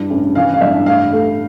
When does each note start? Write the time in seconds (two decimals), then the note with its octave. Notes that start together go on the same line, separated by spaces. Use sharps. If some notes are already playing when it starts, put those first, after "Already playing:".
Already playing: G2 E4
0.10 A1
0.35 E3 F5
0.54 F5
0.61 G2 E5
0.86 A2 F5
1.12 A3